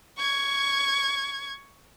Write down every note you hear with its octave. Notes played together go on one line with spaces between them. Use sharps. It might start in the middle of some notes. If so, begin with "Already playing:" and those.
C#6 G#6